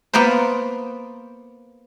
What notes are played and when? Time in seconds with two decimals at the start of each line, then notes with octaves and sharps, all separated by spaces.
0.13 A#3 B3 F4 A#4 C5